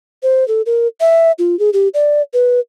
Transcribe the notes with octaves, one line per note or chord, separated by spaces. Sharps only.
C5
A4
A#4
E5
F4
G#4
G4
D5
B4